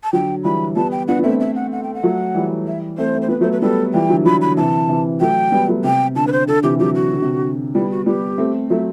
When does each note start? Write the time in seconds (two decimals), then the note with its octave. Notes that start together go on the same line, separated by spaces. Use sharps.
0.04 A5
0.13 D3 F#3 G5
0.44 E3 G3 B5
0.76 G3 B3 A5
0.92 G5
1.08 B3 D4 F#5
1.20 B3
1.23 A3 C4 E5
1.40 E5
1.56 F#5
1.72 F#5
1.83 G5
1.94 F#5
2.03 F#3 A3
2.35 E3 G3
2.67 E5
2.98 A3 C4 C5
3.15 A3
3.22 C5
3.28 B3 B4
3.41 F#3 A3 C5
3.52 B4
3.61 G3 B3 A4
3.94 E3 G3 G5
4.10 D3 F#3
4.25 D3 F#3 B5
4.42 D3 B5
4.57 C3 E3 A5
4.89 C3 E3
5.21 F#3 A3 G5
5.52 G3 B3
5.68 F#3 A3
5.84 C3 G5
6.16 D3 A5
6.27 B4
6.32 C5
6.48 D3 A4
6.63 C3 E3 G4
6.79 D3 F#3 G4
6.95 F#4
7.12 D3
7.22 C3
7.33 D3
7.75 G3 B3 E4
7.91 F#4
8.06 G3 B3 G4
8.38 A3 C4
8.70 F#3 A3 E5